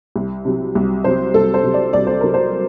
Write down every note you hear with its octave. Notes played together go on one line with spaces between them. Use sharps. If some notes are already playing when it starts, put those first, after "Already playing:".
C2
C3 F#3
C2
C3 F#3 C5
C2 A4
C5
C3 F#3
D5
C2 D5
C5
C3 F#3 A#4
C5